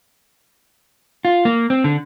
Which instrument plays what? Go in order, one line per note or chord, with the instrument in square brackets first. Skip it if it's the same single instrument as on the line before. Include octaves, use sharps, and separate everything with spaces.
[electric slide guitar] F4
A#3
C4
D3